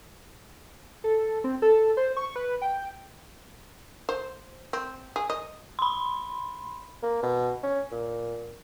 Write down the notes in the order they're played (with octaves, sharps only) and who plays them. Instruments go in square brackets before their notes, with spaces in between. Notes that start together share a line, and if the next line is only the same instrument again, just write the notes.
[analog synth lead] A4
C4
A4
C5
C#6
B4
G5
[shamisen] C5
C4
G#4
D#5
[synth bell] B5 C6
[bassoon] A#3
B2
C#4
A#2